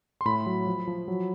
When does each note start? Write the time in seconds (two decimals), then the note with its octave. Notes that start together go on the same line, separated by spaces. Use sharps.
0.21 C6
0.25 A2 B5
0.46 F#3
0.67 F3
0.87 F3
1.08 F#3